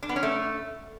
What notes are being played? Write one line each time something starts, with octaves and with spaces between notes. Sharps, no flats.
D4
B3
C#4
A3